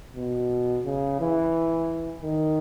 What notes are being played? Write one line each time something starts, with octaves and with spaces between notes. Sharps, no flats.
B2
C#3
E3
D#3